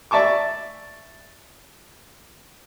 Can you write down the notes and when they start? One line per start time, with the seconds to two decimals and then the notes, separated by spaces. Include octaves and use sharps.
0.11 D5 E5 A5 C#6 D6